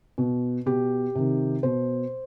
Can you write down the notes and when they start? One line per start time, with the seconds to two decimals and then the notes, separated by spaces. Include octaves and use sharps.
0.18 B2
0.66 B2 G4
1.15 C3 D#3
1.63 B2 C5